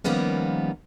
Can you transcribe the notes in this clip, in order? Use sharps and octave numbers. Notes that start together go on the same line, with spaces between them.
D#3 F3 G3 A#3 B3 C#4